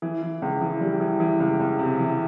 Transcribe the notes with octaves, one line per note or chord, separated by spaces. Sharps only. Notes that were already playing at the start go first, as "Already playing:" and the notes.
E3
E3
C#2
E3
G3
E3
E3
C#2
C#2
C3
E3